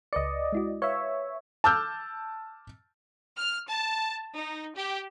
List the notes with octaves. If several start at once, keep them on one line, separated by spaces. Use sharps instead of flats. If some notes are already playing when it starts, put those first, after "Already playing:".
C#2 B4 D5 D#5 C#7
G#3 E4 F#4
B4 C#5 E5 F5
A5 D6 E6 F6 G6
F6
A5
D#4
G4